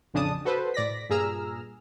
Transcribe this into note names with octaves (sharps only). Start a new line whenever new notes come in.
A1 F2 C#3 D4 A5 D#6
F#4 A4 B4 C5
A2 D5 A#6 B6
G2 A#2 G#4 A#5 E6 F6